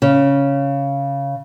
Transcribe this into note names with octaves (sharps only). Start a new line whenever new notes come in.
C#3